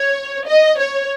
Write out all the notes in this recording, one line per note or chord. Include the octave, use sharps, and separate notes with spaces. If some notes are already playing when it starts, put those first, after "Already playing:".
Already playing: C#5
D#5
C#5